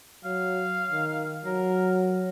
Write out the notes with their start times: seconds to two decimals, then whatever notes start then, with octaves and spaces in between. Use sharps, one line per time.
0.25 F#3 F5
0.91 D#3
1.45 F#3 A#4